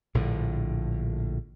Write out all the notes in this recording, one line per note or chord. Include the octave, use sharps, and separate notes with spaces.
A#1 A2 D3